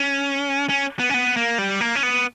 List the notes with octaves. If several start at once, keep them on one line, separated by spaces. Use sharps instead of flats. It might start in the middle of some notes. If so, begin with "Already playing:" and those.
Already playing: C#4
C#4
B3
C#4
B3
A#3
G3
A#3
C#4
B3